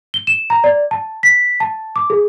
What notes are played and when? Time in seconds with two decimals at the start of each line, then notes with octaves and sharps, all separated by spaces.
0.14 G7
0.27 E7
0.50 A#5
0.64 D5
0.91 A5
1.23 B6
1.60 A5
1.96 D6
2.10 G#4